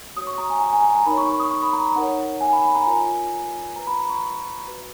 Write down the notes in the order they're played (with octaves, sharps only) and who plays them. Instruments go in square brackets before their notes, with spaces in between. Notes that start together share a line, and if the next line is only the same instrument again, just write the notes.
[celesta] F#4 C#5 D#6
C#6
A#5
G#5
A#5
G#5
A#5
A#5
D#4 A#4 C#5 B5
C#6
C#6
D#6
C#6
B5
A#5
D#4 A#4 C#5 F#5
G#5
B5
B5
A#5
F4 A#4 C#5 G#5
F4 B4 A#5
B5
A#5
C#6
F#4 B4